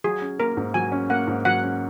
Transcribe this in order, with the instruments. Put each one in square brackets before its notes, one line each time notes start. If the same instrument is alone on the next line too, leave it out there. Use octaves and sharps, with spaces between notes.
[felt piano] F#3 [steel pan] G#4
[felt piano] C#4
[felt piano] A#3 [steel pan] A#4
[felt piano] G#2
[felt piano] F#3 [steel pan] G#5
[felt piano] C#4
[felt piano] A#3 [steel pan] F#5
[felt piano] G#2
[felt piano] F#3 [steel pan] F#5
[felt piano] C#4